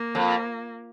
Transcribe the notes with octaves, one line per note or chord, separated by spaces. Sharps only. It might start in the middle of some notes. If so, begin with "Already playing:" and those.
Already playing: A#3
F2